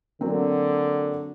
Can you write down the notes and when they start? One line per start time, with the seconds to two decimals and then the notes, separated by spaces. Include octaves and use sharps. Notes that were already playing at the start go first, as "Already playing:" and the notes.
0.21 D3 F#3 A#3 C4